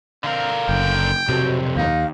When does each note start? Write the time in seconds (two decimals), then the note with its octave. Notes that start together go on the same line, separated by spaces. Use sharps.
0.24 D3 C4 A#4 F5
0.69 F#1 G5
1.29 B1 F2 C3 F#4
1.76 D#2 D#4 F5